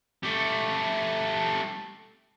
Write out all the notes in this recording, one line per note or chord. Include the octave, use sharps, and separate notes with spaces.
A3 G4